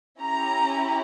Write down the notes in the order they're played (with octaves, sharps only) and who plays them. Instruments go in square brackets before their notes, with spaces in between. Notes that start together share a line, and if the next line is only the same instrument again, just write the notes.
[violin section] C#4 E4 G4 A#5